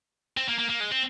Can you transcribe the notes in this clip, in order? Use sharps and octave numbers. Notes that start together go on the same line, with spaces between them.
C4
A#3
A#3
A#3
G#3
C4